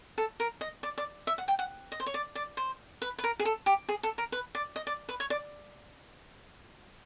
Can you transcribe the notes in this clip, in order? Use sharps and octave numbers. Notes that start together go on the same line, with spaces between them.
A4
A#4
D#5
D5
D5
E5
F#5
G5
F#5
D#5
C5
C#5
D5
D5
C5
B4
B4
A#4
G#4
A4
G4
G#4
A4
A#4
B4
D5
D#5
D5
B4
C#5
D5